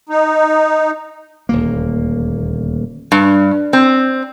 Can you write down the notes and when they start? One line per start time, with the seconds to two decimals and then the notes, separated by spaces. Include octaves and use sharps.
0.09 D#4
1.49 D#1 D2 A#3
3.12 G2
3.73 C4